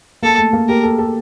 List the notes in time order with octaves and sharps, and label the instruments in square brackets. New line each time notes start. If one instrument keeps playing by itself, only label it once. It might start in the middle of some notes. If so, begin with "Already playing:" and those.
[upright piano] A#3 [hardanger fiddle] A4
[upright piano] A3
A#3
[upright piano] G4 [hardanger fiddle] A#4
[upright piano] A4
A4